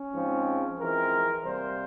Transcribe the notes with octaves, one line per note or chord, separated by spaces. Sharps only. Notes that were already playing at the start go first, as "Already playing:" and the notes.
Already playing: C#4
G#2 F3 G#3 C4
F2 E3 G#3 C4 A#4
C3 G3 A#3 C5